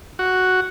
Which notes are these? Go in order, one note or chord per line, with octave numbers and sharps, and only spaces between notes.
F#4